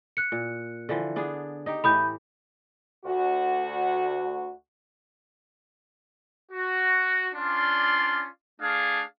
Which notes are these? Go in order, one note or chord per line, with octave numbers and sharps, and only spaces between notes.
F#6 C#7
A#2
D3 E3 F3
B3 D4 G#4
D#4 G4
A2 E3 G4 B5 D#6 G6
D2 F#4
F#4
C#4 D4 F4 D5 F5 C6
A3 D4 G#4 F5